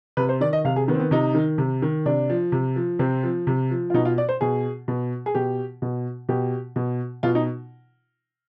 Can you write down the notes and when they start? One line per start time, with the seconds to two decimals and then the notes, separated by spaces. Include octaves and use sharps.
0.17 C3 B4
0.29 C5
0.41 D#3 D5
0.53 D#5
0.65 C3 F5
0.76 G#4
0.88 D#3 B3
0.94 C4
1.00 B3
1.11 C3 D#4
1.35 D#3
1.58 C3
1.82 D#3
2.06 C3 D4
2.30 F3
2.52 C3
2.76 F3
2.99 C3 C4
3.23 F3
3.47 C3
3.71 F3
3.90 F4
3.94 B2 D#4
4.05 F4
4.18 D5
4.29 C5
4.41 B2 G#4
4.88 B2
5.26 G#4
5.35 B2 G4
5.82 B2
6.29 B2 G4
6.76 B2
7.23 B2 F4
7.35 D#4